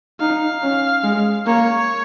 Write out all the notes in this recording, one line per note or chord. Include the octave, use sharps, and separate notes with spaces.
D#4 F5
C#4
G#3
A#3 C#5